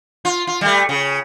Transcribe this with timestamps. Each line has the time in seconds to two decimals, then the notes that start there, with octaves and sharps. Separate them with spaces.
0.25 F4
0.47 F4
0.61 G3 A3
0.89 C#3